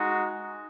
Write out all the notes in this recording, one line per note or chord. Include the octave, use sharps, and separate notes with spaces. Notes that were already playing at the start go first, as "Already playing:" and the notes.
Already playing: G#3 D#4 F#4